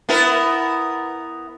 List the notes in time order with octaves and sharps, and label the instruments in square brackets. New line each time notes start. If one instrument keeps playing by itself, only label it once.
[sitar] B3 E4 A#4